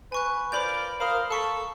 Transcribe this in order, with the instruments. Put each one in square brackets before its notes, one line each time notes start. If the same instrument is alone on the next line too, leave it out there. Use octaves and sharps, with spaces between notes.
[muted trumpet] B4 [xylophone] G#5 C#6 F#6
[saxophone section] F4 A#4 D5 [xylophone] C5 B5 G6
[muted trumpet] A#4 [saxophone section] C5 F5 [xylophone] B5 D#6
[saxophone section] A4 [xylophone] F5 C#6 B6 [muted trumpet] A5